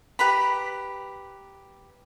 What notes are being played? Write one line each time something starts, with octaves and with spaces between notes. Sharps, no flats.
G4 B4 A#5 B5